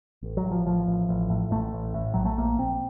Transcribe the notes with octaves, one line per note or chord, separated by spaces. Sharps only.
A1
F#3
A1
F3
A1 F3
A1
A1
A2
A1 A3
A1
A2
A#1 F#3
A3
A#1 A#3
A#1 C4